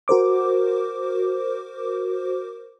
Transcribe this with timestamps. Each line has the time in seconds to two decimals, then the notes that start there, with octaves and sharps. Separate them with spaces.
0.08 F#4 A#4 C5 D6